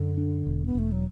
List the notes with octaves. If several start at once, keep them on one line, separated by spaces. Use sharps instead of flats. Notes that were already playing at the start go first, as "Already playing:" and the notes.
Already playing: F#2 D3
D4
E1
B3
E1 A3
F#3